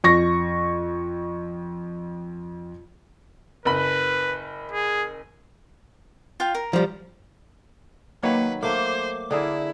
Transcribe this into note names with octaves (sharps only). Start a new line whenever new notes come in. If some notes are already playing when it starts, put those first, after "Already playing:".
F2 C#6 A#6
F#1 B4 B5
G#4
F4 F5 G5
A#4
F3 G3
D#3 F#3 A#3 B4 C#5
A3 A#3 C5 D6
D3 E4 G#4 A#4